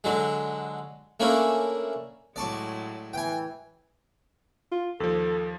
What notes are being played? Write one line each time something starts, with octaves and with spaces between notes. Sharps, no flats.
D3 F#3 G#3
A3 A#3 C#4 D4 E4
A2 F#3 G#3 D5 A5 C#6
E3 G5 G#5
F4
D#2 F3 A4